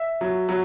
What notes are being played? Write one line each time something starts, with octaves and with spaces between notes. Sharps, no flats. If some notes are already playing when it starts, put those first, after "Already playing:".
Already playing: E5
F#3
F#3